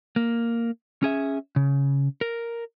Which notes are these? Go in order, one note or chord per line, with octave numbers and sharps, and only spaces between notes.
A#3
C#4 G#4 E5
C#3
A#4